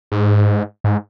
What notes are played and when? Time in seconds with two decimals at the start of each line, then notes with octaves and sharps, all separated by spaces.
0.12 G#2
0.84 G#2